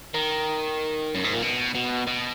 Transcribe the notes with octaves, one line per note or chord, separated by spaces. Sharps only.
D#3
F#2
G#2
A#2
B2
B2
B2